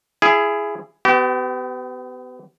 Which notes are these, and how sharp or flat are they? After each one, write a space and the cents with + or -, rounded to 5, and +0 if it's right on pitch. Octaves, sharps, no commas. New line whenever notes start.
E4 +25 G#4 +0
B3 +30 G4 -35